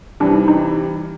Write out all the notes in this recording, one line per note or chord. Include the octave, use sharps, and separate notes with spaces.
C3 E3 G3 D4
D#4
D#4